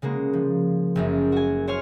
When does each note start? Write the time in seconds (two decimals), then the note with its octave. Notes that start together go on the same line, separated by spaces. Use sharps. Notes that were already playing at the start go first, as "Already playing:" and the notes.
0.02 C#3 G#3 A#3 F#4
0.33 F3
0.95 F#1 F#2 G#3
1.32 F#4 G#5
1.67 C5 C#5 G#5 F6